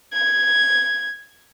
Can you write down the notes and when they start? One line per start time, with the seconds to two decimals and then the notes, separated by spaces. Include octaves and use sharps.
0.14 G#6